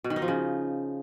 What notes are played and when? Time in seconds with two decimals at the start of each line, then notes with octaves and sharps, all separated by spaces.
0.04 B2
0.10 D#3
0.16 D#4
0.22 F3
0.28 C#3